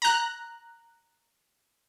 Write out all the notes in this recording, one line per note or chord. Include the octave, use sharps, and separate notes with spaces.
A#5 F#6